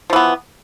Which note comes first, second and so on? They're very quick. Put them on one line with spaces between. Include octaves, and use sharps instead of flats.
F3 E3 B3